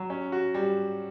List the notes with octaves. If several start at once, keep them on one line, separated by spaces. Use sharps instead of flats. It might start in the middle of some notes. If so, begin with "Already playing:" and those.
Already playing: F#3
C#4
F#4
G3